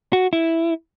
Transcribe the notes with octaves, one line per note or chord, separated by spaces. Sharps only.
F#4
E4